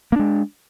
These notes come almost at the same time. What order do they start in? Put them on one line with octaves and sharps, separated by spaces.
A#3 D4 G#3